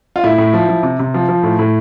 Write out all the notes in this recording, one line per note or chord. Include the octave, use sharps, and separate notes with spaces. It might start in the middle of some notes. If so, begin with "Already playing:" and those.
F4
A2 E4
A2
F3
F3
C3
C3
F3
F3
A2
A2